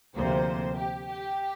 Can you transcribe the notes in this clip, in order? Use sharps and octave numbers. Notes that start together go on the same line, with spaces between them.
D2 C3 F3 A#3 C5
G4
G4